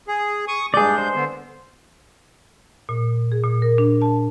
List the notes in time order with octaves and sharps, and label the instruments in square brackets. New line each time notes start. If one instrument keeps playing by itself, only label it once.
[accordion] G#4
C#6 D#6
[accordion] G2 G#3 G6 [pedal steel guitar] G#4 D5
[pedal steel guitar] C5
[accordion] D3 B3
[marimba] A#2
G#4
A#2
A#4
D4
A5